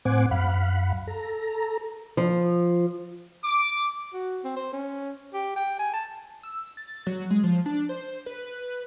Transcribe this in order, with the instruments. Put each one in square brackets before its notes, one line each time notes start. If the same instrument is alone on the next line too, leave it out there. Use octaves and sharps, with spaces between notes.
[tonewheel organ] A2 C4 C5 F#5 G#5 D6
F#2 F5 F#5 B5
A4 A#5
[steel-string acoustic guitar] F3
[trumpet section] D6
[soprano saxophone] F#4
C4
C5
C#4
G4
G5
G#5
A5
[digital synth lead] E6
A6
F#3
G#3
F3
D4
C5
B4